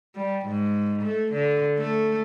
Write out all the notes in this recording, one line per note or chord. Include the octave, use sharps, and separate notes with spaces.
G3
G#2
A3
D3
A3